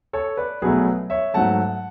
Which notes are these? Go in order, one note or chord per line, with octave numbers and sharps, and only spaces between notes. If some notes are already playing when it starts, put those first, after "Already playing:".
A4 C#5
B4 D5
B1 B2 F#3 A3 G#4 B4
C#5 E5
G#2 F#3 A3 F#5 A5